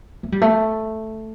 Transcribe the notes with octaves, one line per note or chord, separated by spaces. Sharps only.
A3
G3
A3